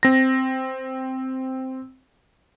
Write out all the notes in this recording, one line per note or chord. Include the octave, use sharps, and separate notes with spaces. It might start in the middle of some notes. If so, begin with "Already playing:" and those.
C4 A#6